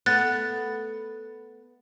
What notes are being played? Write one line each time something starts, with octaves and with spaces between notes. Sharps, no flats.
A3 B3 F#6 A6